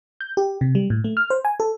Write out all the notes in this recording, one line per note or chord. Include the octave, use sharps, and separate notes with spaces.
G6
G4
C3
G3
A2
A3
F6
C5
G#5
A4